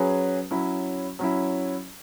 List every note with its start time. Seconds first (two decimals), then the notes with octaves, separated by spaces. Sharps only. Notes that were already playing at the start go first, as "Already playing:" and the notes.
Already playing: F#3 C#4 G#4 B4
0.51 F#3 C#4 E4
1.19 F#3 C#4 E4